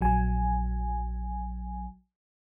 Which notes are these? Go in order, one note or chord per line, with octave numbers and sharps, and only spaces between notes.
A#1 F#3 G#5